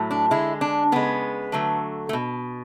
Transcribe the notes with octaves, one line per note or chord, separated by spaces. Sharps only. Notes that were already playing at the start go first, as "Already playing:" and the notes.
Already playing: A2 F#3 A3
D4
D3 G#3 E4
D4
C#3 G#3 B3
D3 F#3 A3
A3
B2